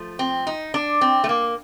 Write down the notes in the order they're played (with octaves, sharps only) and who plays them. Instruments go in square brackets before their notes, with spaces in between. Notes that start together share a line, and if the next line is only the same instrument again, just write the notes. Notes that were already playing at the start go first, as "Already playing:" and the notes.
Already playing: [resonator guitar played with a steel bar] F3 A3
C4
D#4
D4
C4
A3
A#3